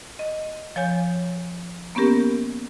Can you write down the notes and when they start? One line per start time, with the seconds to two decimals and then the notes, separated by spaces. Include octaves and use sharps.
0.19 D#5
0.76 F3 C#5 G#5 G6
1.95 A#3 B3 C#4 G4 A#4